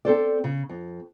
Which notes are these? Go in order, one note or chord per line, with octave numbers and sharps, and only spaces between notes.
C4 A4 C5 D5
C#3
F2